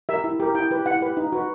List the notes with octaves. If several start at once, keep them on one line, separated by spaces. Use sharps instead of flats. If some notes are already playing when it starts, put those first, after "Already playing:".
G4 A#4 E5
E4
G4 A#4
E4 G5
G4 B4
E4 F#5
G4 B4
D#4
F#4 B4